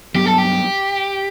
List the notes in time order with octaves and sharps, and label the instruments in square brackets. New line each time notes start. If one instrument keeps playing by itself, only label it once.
[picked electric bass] G2 F#3 B3 [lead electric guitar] G4
[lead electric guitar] A4
G4